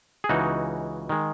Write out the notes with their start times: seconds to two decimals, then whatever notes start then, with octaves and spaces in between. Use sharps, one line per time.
0.24 G#4
0.29 C#2 C#3 E3 G#3 D#4 F#4
1.09 D#3 G#3